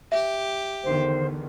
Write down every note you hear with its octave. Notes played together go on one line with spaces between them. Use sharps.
G4 E5
E2 D3 D#3 C5